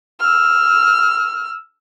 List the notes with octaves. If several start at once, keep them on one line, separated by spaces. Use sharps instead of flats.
E6 F6